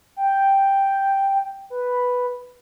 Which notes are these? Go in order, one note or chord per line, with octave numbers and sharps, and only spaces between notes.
G5
B4